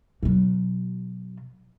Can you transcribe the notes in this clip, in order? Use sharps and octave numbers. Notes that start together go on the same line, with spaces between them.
B2 F#3